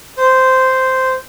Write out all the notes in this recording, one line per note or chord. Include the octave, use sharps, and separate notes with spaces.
C5